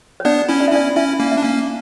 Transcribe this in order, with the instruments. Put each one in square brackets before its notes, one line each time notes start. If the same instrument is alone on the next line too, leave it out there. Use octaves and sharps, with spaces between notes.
[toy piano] C#5
[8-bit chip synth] B3 D4 [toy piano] D5
[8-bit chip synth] C#4 E4
[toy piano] D5
E5
[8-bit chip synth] C#4 E4 [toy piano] D5
[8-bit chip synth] C#4 E4 [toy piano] E5
[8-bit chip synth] A#3 C#4
[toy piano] E5
[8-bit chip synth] D4
A#3 C#4